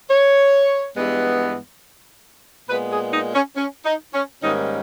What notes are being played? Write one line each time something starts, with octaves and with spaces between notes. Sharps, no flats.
C#5
G2 E3 G#3 B3
A#2 G#3 B3 B4
G#4
D#4
C#4
C#4
D#4
C#4
G#2 D#3 G3 A#3 C#4 D#4